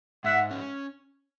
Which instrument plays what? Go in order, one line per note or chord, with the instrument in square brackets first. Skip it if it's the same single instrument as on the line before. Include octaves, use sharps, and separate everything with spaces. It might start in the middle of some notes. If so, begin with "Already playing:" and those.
[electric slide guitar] G#2 [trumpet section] E5 F#5
[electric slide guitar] C#4